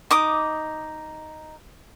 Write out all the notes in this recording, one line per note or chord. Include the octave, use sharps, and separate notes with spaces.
D#4 D6 D#6